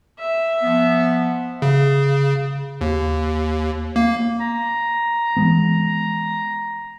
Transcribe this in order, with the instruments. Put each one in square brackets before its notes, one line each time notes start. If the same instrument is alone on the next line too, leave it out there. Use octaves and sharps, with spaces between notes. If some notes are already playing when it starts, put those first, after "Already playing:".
[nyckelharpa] E5
[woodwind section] F3 B3
[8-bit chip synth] C#3
D#2
A#3
[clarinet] A#5
[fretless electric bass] E3 G#3 B3